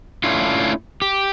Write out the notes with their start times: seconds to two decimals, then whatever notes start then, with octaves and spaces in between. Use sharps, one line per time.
0.24 A3 C#4 D4 E4 F4
1.02 G4